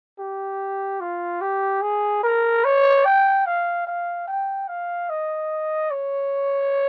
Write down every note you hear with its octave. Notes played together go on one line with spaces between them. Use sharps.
G4
F4
G4
G#4
A#4
C#5
G5
F5
F5
G5
F5
D#5
C#5